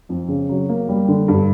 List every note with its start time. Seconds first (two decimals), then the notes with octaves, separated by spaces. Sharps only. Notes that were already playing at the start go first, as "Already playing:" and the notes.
0.09 F2
0.28 C#3
0.49 F#3
0.69 A#3
0.89 G3
1.08 D3
1.28 G2